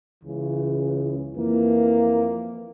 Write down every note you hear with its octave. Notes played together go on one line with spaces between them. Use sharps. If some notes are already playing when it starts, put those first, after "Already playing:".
C#2 C#3 E3
F2 E3 A#3